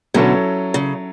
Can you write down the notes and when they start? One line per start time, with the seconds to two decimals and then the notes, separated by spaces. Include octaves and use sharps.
0.14 B2 D3 F#3 C#4 E4 A4 C#5
0.74 C#3